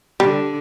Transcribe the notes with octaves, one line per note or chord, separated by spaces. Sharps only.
D3 G3